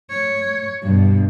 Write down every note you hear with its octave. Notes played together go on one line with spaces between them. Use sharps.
C#5
G2 B2